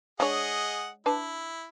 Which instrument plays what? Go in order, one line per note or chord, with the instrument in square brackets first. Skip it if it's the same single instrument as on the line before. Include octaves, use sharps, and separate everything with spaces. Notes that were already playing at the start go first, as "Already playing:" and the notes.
[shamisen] G#3 D4 C#5 [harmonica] G#4 D#5 F#5
[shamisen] D4 B4 A5 [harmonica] E4